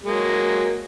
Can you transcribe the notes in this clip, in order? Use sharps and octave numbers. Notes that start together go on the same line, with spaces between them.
F#3 G#3 A#3